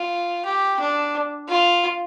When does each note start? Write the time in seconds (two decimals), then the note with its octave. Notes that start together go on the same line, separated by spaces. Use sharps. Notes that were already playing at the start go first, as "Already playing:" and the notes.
Already playing: F4
0.45 G4
0.80 D4
1.49 F4